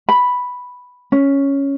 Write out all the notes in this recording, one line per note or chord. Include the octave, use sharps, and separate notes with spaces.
B5
C#4